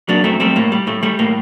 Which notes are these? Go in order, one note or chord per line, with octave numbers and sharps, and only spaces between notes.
F#3 A#3 D4
F#2 A3 C4
G3 A3 C4
A2 A#3
G3
A2 A3
G3 A3
A2 A#3